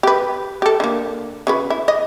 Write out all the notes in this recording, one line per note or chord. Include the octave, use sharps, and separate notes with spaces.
G4 B4
G4 A4
D3 A#3
C#3 F#4 B4
E4
D#5